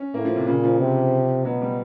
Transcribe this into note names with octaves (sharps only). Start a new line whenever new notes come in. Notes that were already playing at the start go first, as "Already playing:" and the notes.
Already playing: C#4
A2 A#3
F3
C3
A#2 C#3
F3
C3
B2 F#3
G3